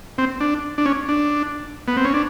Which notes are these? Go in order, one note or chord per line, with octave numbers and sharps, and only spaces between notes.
C4
D4
D4
C#4
D4
B3
C4
C#4
D4